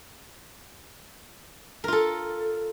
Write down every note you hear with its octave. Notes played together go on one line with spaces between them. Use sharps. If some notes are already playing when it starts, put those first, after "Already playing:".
F4 A4 A#4